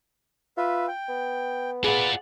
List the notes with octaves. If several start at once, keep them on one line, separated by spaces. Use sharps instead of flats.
F4 B4 E5
G5
B3
F4 G#4 B4 D5 F#5